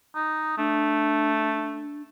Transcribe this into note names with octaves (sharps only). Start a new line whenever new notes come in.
D#4
A3 D4